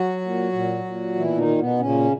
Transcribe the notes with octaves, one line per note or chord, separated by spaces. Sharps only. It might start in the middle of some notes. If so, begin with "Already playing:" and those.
Already playing: F#3 F#4
A#2
A#2
A#2
B2 E3 E4
D#3 D#4
B2
B2 B3
A#2 C#3 C#4